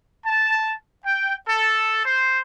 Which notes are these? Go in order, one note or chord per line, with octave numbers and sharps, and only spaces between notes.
A5
G5
A4
C5